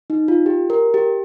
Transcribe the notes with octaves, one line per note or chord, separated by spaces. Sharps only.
D#4
F4
G4
A#4
G4